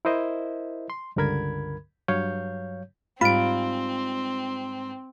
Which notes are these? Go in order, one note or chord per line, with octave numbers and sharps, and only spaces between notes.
E4 A#4 C5 D#5 E5
C6
C#2 G2 D3 A#4 B5 G#6
G2 F#3 C#5 F5 G6
G#2 G3 C4 F4 B5 D7